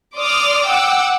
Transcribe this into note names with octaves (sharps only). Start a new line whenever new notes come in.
D5 C6 D6 D#6 F6
F#5 G5 D6 E6